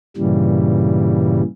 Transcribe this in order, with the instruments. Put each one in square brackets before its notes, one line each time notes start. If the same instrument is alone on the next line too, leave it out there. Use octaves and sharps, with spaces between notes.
[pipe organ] G2 A#2 C#3 E3 G3